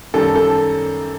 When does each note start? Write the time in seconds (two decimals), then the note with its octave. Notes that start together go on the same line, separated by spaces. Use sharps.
0.14 F#2 D#3 G3 A4
0.35 A4